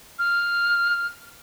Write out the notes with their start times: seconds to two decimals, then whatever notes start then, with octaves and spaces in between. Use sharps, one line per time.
0.19 F6